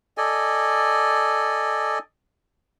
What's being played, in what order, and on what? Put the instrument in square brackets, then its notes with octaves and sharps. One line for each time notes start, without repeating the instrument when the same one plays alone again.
[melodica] A4 D5 D#5 G#5